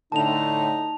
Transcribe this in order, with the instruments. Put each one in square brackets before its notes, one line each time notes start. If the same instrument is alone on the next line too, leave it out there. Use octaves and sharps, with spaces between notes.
[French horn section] A2 D3 [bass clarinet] D#4 [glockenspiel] A5 F7